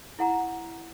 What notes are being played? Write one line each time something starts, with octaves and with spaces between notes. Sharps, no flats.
E4 F#5 A#5